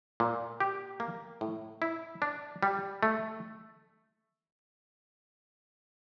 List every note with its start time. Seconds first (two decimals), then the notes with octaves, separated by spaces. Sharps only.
0.20 A#2
0.60 G4
1.00 A#3
1.41 A2
1.82 E4
2.22 D4
2.63 G3
3.03 A3